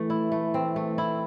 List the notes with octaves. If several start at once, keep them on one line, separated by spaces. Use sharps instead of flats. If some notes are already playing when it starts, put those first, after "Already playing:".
Already playing: E3 A3
E4
A3
C4
A3
E4